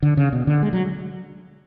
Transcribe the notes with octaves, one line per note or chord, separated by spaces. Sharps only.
D3
C#3
B2
D3
G#3
F#3